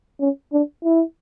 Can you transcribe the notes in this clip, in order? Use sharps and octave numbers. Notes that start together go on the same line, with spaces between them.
C#4
D4
E4